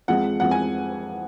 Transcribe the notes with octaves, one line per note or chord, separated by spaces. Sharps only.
F2 F3 G#3 F#5
F2 F3 G#3 F#5
G#5